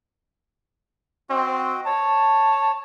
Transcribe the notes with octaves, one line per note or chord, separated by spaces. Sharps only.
C4 F#4 D#5
C#5 A5